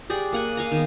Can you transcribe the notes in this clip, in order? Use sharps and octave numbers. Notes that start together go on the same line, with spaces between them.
G4 G#4 D5 F#5
A#3 F#5 G#5
F5 G#5 A#5
D#3 B3